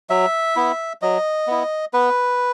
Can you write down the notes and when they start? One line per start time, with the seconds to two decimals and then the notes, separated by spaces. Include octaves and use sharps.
0.10 F#3 E5
0.56 B3 E4
1.02 F#3 D#5
1.47 B3 E4
1.93 B3 B4